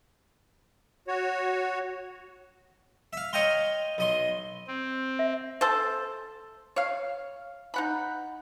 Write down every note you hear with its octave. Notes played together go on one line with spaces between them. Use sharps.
F#4 C#5
E5 F5
C#5 D#5 F5 G5 A#5 C6
B1 D#5 C6
C4
E5
A4 C5
C#5 F5
D#4 F#5 B5